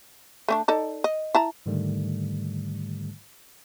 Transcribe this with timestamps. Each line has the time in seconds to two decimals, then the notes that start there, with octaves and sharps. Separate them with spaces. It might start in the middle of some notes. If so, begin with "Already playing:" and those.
0.48 A3 C#4 D4
0.68 D#4 A4 D5
1.04 D#5
1.35 E4 A5 A#5
1.66 G#2 D3 D#3 G3 A3